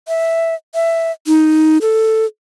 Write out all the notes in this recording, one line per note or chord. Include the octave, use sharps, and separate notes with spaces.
E5
E5
D#4
A4